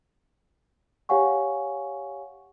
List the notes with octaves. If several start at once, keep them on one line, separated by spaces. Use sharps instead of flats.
G4 C#5 F5 F#5 G#5 C#6